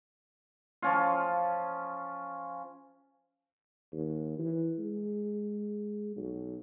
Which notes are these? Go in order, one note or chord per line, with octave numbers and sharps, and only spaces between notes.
F3 C#4 F4
D#2
E3
G#3
B1